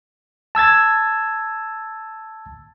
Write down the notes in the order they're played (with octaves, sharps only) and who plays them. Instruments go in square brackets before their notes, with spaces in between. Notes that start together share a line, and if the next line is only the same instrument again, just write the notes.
[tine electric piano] A5 E6 G#6 A6